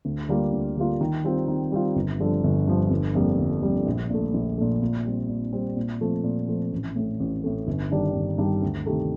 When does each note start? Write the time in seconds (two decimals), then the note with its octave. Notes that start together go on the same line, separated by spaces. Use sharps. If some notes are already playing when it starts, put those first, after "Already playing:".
0.05 D2
0.28 D3 G3 A#3 F4
0.53 D2
0.77 D3 G3 A#3 F4
1.01 D#3
1.24 G3 C4 F4
1.48 D#3
1.72 G3 C4 F4
1.95 G1
2.19 G2 D3 F3
2.44 G1
2.68 G2 D3 F3
2.90 G1
3.15 F2 D3 G3 A#3
3.38 G1
3.62 F2 D3 G3 A#3
3.86 A#1
4.10 A#2 A3
4.34 A#1
4.58 A#2 A3
4.82 A#2
5.05 G3 C4
5.29 A#2
5.53 G3 C4
5.76 A#2
6.01 F3 A3 C4
6.24 A#2
6.48 F3 A3 C4
6.72 A1
6.96 A2 A3
7.20 A1
7.43 A2 A3
7.67 G1
7.91 G2 D#3 G3 D4
8.15 G1
8.38 G2 D#3 G3 D4
8.62 D2
8.86 C3 D#3 A3